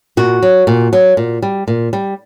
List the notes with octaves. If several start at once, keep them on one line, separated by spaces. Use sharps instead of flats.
A#2 F#4
F#3
A#2
F#3
A#2
G3
A#2
G3